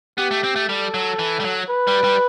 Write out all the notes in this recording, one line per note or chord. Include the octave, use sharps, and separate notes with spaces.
B3 G4
A3
C4
A3
G3 A4
F#3
E3
G3
F#3
B4
G3
G3